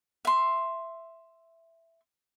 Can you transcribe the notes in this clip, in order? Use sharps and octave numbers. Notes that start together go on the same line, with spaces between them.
E5 C6